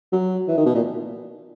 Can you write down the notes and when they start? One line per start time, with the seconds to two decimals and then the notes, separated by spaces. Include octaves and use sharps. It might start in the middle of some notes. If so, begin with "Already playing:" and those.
0.12 F#3
0.48 E3
0.57 D#3
0.66 B2
0.75 A#2